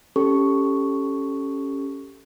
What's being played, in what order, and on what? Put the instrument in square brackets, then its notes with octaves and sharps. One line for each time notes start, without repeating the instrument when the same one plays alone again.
[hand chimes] C#4 G4 A4 C#6